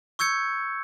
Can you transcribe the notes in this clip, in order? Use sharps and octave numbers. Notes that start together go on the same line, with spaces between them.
C#6 E6 G6 G#6 C#7